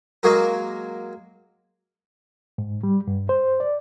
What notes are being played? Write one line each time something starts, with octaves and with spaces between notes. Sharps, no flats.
F#3 G#3 A#3 F#4 G#4 A#4
G#2
G3
G2
C5
D5